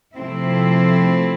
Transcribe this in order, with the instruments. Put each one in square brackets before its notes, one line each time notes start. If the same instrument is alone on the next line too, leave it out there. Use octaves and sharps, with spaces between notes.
[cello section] C3 F3 A3 C4 E4